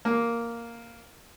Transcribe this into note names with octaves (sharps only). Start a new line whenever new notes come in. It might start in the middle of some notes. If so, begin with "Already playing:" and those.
A#3